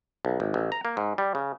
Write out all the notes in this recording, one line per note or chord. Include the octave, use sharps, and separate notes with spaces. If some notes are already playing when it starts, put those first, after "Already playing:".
B1
G#1
A1
A#5
A#3
G#2
G3
C#3